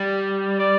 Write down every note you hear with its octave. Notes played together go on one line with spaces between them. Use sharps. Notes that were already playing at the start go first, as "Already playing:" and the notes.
Already playing: G3
D5